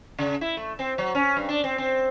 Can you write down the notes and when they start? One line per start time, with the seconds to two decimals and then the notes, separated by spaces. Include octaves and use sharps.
0.19 C#3
0.41 E4
0.57 A3
0.79 C4
0.98 F#3
1.15 C#4
1.37 G2
1.49 D4
1.64 C4
1.78 C4